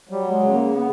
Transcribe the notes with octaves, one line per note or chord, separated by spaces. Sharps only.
F#3 G3
G#3
C#3
A#3
B3